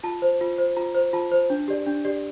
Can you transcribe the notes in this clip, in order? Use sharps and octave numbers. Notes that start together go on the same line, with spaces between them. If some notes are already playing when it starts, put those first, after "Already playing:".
F4 A5
C5
F4
C5
F4 A#5
C5
F4 A5
C5
D4
G4 D5
D4
G4 D5